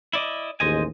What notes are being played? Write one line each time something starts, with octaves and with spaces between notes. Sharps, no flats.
E4 D5 D#5
A1 D#2 G#3 C5 D#5 G#5